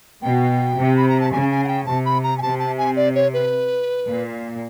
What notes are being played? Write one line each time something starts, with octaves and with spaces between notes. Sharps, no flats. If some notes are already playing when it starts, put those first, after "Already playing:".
B2 G5
C3
B5
A#5
A5
C#3 G#5
G#5
F#5
G5
C3 A5
B5
A#5
G#5
C3 A5
A5
G#5
D5
C#5
B4
A#2